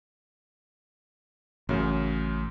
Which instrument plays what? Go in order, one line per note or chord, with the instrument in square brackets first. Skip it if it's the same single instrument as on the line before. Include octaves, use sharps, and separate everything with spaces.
[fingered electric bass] A1 [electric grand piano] F#2 C#3